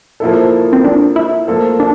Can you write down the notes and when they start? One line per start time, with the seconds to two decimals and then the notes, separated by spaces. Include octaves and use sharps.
0.20 F3 A#3 E4 A4
0.73 C4
0.84 D4
1.16 E4
1.48 F3 A#3 F4 A4
1.80 D4